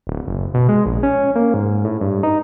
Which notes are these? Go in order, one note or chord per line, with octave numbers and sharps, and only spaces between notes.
D1
F#1
B2
G#3
A#1
C#4
A#3
G#2
A2
G2
D#4